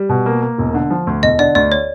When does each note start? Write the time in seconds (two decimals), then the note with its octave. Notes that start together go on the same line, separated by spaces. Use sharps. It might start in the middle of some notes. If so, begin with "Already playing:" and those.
Already playing: G3
0.09 B2
0.26 A#3
0.42 A#3
0.58 E1
0.74 D3
0.90 F3
1.07 D2
1.23 E1 D#5
1.39 D3 D5
1.55 D2 D5
1.72 C#5